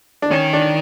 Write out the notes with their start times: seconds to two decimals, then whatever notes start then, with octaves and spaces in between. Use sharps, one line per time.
0.22 D4
0.31 D#3 C#4
0.53 D4